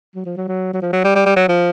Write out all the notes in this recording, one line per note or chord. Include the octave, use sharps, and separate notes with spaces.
F#3
F3
F#3
F#3
F#3
F3
F#3
G3
G3
G3
F#3
F3